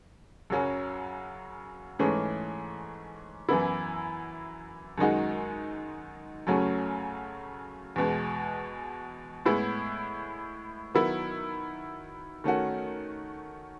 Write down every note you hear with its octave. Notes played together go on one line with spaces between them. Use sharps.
F#2 C#3 F#3 C#4 F#4
G#2 E3 A3 C#4 G#4
F#2 E3 B3 E4
F#2 D#3 G#3 D#4 F#4
F#2 C#3 F#3 A3 C#4
E2 B2 G#3
A2 G#3 B3 E4
D#3 F#3 B3 E4
D#3 A3 C#4 F#4